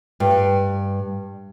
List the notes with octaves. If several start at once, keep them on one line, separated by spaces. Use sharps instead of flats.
G2